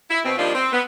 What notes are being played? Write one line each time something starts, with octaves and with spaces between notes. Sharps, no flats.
E4
B2 C4
F3 G3 A#3 D4 D#4 F4
C4
B3